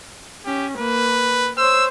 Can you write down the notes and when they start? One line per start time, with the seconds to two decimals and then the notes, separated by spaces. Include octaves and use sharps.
0.46 C#4 G4
0.78 A#3 B4
1.58 C5 C#5 E6